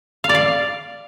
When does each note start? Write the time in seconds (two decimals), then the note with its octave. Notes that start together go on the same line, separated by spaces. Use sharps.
0.24 F5
0.29 D5
0.35 F5